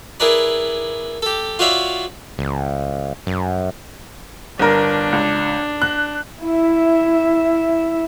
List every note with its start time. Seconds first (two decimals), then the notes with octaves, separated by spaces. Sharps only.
0.20 E4 G#4 A#4 B4 D5
1.22 G4 A4
1.59 F4 F#4 C#5 D5 E5 F5
2.38 C#2
3.27 F#2
4.59 G1 D4 A#4
5.12 C#2
5.82 F#6
6.43 E4 E5